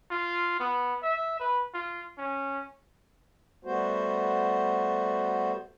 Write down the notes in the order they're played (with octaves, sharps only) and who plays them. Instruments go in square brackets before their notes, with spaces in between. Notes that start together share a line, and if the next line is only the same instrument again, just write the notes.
[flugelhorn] F4
B3
E5
B4
F4
C#4
[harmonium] G3 A3 B3 F#4 C5